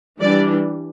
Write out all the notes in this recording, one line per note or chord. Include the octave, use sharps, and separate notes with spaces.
E3 G3 D4 D5